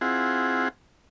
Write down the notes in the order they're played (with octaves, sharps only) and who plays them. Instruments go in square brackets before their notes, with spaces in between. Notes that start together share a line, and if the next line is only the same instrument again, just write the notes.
[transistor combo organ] C4 E4 F4 G#4 F#5